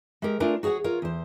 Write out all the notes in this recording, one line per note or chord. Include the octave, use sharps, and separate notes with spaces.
G#3 G4 A#4
A3 D4 F4 A#4 G#5
F#4 G#4 C#5 E5 F#5
F4 A#4 C#5
E2 C5